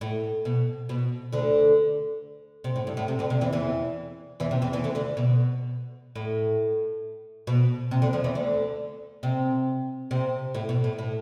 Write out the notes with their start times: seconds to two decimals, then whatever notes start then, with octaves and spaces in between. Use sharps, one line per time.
0.01 A2
0.45 B2
0.89 B2
1.32 D2 D3
2.64 C3
2.76 A2
2.87 G2
2.97 A2
3.08 C3
3.19 D2 D3
3.30 C3
3.41 E2 E3
3.52 E2 E3
4.40 E2 E3
4.51 C3
4.62 E2 E3
4.73 E2 E3
4.84 D2 D3
4.95 D2 D3
5.17 B2
6.15 A2
7.47 B2
7.91 C3
8.02 D2 D3
8.13 F2 F3
8.24 E2 E3
8.35 D2 D3
9.23 C3
10.11 C3
10.55 A2
10.69 B2
10.84 A2
10.99 A2